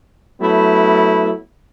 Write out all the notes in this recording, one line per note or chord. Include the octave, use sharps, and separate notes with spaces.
F#3 A3 B3 E4